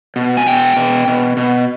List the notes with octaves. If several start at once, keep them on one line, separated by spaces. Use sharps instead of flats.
B2
G#5
B2 G5
B2
B2
B2